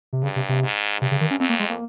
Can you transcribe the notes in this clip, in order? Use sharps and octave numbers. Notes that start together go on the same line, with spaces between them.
C3
G2 C#3
C3
C3
G#2
G2 C3
C#3
D#3
C#4
F2 C4
A#3
G#3
A#3